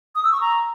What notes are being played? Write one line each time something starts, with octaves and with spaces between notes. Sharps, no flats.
D#6
E6
C#6
A#5